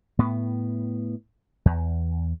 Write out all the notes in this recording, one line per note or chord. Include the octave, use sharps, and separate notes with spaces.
A2 B3
E2